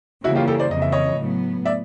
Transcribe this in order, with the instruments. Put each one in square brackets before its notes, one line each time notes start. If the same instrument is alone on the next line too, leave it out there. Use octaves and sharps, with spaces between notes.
[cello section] C#3 E3 G3 A#3 [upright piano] E4 F#4
[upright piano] F4 G4
G4 A4
C5 D5
[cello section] F2 C#3 E3 [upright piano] D#5
[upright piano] E5
C#5 D#5
[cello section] A2 F#3 B3
[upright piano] D5 E5